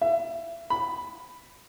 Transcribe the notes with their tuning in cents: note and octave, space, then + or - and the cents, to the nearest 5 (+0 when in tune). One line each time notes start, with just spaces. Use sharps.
E5 +30
B5 +10